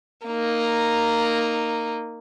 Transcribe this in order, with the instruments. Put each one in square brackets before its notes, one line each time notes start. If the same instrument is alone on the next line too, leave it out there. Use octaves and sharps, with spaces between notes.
[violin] A#3 D#4